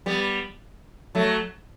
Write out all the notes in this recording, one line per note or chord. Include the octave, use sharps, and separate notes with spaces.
G3 B3
F#3 A3